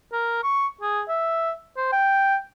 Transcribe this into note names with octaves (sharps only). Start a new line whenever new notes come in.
A#4
C#6
G#4
E5
C5
G5